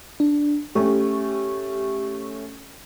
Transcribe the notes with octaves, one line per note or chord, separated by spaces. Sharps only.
D4
A3 C#4 G4